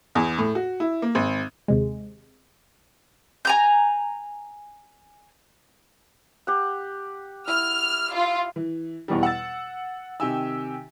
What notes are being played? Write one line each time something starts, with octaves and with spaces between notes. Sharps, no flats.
E2
A2
F#4
E4
A#3
G#1
D#2 C3 G#3
G#5 A#5 G6
G4 F#5
E4 F6
F4
E3
E2 B2 E3 G3
F#5 E6 A6
C3 D#3 G4 G5 G#5 E6